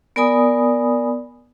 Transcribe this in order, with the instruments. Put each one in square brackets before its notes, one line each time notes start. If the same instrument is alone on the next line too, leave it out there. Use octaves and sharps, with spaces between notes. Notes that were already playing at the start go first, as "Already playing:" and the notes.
[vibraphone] B3 A#4 D5 G#5 B5 D#6